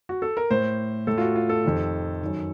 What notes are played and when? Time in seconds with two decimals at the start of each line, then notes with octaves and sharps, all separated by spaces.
0.09 F#4
0.22 A4
0.37 A#4
0.50 A2 C5
1.07 A2 A4
1.18 F4
1.21 F#4
1.36 F4
1.49 A4
1.64 F2 C3 D#3
2.22 F#2 D#3